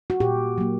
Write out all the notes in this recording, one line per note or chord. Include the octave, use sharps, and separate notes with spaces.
F#4
A#2 G4
F#3 A#3